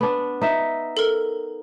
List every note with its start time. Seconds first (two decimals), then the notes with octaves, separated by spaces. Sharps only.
0.01 B3 D4
0.42 D#4 E5
0.97 A4 A#4